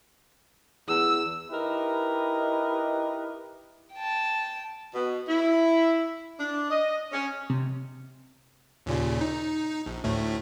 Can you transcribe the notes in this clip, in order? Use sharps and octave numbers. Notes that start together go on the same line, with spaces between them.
E2 E6
D#4 E4 G4 A#4 B4 D#5
G5 A5
B2
E4
D4
D#5
C#4
C3
D#2 A#2 C#3
D#4
A#1
D2 A2 A3